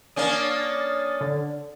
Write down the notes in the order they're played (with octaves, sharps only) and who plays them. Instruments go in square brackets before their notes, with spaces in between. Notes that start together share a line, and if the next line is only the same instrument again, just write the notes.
[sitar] A#3 C#4 D4 [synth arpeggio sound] D#6 A6
[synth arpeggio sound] D3